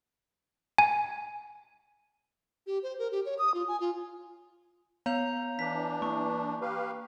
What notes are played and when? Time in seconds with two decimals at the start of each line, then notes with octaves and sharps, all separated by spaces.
0.78 G#5
2.67 G4
2.83 C5
2.99 A#4
3.12 G4
3.26 C#5
3.39 D#6
3.54 F4
3.68 G#5
3.80 F4
5.06 B3 C#5 F5 A#5 G6 F7
5.59 E3 D4 B6
6.02 A#3 C#6
6.62 G4 B4 F5